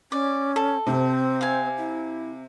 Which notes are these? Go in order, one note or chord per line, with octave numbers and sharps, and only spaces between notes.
C#4 D5
A4
C3 C4
F5 G#5
E4